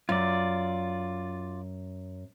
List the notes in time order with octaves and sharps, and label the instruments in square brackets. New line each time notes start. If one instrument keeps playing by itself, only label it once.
[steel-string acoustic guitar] F#2 [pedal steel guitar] F4 D5